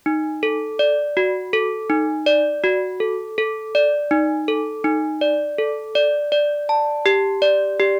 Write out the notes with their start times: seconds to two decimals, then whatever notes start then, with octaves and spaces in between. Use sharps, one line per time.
0.06 D#4
0.43 A4
0.79 D5
1.17 F#4
1.53 A4
1.90 D#4
2.26 D5
2.64 F#4
3.00 A4
3.38 A4
3.75 D5
4.11 D#4
4.48 A4
4.84 D#4
5.21 D5
5.58 A4
5.95 D5
6.32 D5
6.69 A5
7.06 G4
7.42 D5
7.80 G4